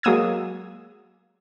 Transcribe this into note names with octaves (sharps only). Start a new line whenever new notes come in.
F#3 G#3 A#3 D#6 E6 G#6